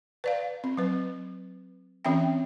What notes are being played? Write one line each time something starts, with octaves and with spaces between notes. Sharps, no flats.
B4 D5 F5
C4
F#3 B4
E3 C4 C#4 E5 G5